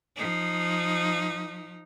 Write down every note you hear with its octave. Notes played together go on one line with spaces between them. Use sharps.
F3 D#4